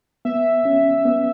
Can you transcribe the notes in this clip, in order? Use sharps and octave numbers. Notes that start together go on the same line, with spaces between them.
B3 E5
C#4
B3